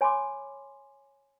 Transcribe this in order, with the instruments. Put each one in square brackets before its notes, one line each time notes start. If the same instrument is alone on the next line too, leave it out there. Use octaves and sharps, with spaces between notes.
[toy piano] C#5 G#5 B5 C6 D6